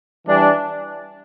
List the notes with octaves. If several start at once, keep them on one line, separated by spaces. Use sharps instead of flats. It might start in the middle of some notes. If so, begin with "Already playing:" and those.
E3 G3 D4